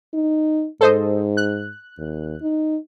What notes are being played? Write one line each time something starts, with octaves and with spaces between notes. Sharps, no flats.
D#4
G#2 A4 C5 D#5
F#6
D#2
D#4